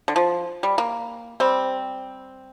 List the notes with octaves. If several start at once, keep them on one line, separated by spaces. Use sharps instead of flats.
D3
F3
G3
A#3
G3 C4